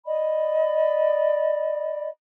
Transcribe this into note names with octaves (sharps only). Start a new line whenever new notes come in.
D5 D#5 B5